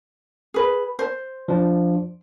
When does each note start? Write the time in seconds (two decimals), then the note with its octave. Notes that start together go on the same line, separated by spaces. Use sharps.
0.54 G#4 B4
0.99 C5
1.48 F3 D4